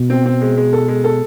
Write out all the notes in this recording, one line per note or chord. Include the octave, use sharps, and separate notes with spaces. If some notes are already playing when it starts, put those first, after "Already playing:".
Already playing: B2
C4
C4
G#3
G#3
A4
G#3
A4